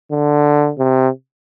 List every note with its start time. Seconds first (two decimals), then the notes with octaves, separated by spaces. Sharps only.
0.11 D3
0.78 C3